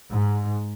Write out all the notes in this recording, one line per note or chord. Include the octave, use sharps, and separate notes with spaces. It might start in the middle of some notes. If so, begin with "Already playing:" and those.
G#2